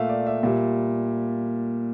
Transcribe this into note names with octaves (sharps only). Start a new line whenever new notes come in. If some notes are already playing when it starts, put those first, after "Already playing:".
Already playing: A#2 A3 E5 F5
D5
E5
A#2 G3